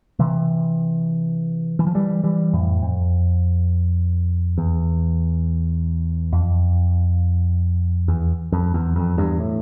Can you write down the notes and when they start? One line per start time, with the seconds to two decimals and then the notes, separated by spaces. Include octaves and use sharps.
0.19 C3 E3
1.79 E3
1.87 F3
1.94 E3 G3
2.24 E3 G3
2.53 F2 A2
2.82 F2
4.58 E2
6.33 F2
8.08 E2
8.52 F2
8.74 E2
8.96 F2
9.18 E2 G2
9.40 A2